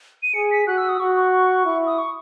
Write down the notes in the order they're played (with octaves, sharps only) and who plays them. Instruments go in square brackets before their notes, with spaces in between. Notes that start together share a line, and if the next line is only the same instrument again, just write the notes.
[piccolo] D#7
[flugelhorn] G#4 [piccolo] C#7
[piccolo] B6
[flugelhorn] F#4 [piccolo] F#6
[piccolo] E6
D#6
[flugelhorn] F#4 [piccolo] C#6
[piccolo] C#6
C#6
[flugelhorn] E4
[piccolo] D#6
C#6